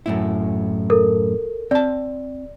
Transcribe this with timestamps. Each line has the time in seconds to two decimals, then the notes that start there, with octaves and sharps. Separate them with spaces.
0.06 F#2 A2 E4
0.90 A4 A#4
1.71 C4 D5 A5